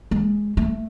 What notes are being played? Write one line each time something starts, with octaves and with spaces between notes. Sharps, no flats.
G#3
A3